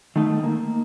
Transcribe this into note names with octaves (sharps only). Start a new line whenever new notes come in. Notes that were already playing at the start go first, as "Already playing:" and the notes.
D#3 A3 D#4
A#3